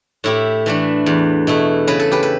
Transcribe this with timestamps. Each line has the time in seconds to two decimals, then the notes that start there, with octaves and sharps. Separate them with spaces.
0.24 A2 E4 G4
0.66 E3 A3 D4
1.06 E2
1.47 B2 A3 E4
1.87 C#3 B4
2.00 A4
2.11 G4 B4
2.23 B4